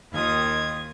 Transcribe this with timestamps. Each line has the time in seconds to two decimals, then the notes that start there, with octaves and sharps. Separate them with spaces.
0.13 D#2 D#3 F4 D#6 G#6